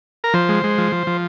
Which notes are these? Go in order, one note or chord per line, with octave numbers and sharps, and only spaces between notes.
A#4
F3 C5
G#3
G#3
F3
F3
F3